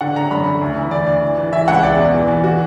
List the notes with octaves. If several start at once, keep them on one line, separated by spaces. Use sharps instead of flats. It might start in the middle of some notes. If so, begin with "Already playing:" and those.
D3 F#5
D3 A#5
F#2 B5
D3
D2
E3
D2 D5
D2
E3
E3
E3 E5
C#2 F#5
E2 D5
B2
E3
E3
F#4